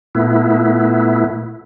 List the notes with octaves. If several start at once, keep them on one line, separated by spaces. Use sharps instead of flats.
A#2 A3 B3 E4